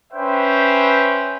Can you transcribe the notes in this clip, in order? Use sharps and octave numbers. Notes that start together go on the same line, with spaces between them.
C#4 B4 C5 E5 G5